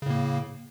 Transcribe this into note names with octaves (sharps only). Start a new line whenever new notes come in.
A2 C#3 A#3